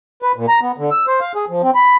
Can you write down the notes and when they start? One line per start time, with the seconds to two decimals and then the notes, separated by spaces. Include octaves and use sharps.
0.22 B4
0.37 A#2
0.48 A#5
0.61 B3
0.78 D3
0.91 E6
1.08 C5
1.21 F5
1.35 G#4
1.49 F3
1.63 C4
1.75 B5